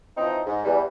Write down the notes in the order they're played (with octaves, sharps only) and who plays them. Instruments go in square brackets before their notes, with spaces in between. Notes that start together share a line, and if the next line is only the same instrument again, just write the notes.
[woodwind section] E3 F3 C4 D#4
G#2
E2 E3 G3